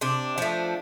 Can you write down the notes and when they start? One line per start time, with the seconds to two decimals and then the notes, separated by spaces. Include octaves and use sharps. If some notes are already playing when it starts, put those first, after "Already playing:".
0.01 C3 D4
0.38 F3 A3